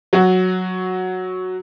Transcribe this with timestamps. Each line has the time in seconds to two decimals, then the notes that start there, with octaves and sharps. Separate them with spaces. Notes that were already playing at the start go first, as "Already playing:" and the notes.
0.13 F#3 F#4